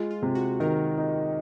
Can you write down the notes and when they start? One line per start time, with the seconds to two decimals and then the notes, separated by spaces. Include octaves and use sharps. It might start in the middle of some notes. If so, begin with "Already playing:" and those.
Already playing: G#3 F4
0.11 F4
0.22 C3
0.35 F#4
0.60 D#3 A#4
0.98 D#4